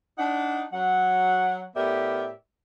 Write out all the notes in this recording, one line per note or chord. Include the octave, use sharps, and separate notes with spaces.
D4 D#4 F#5
F#3 F#5
A2 B3 G4 A#4 D5 E5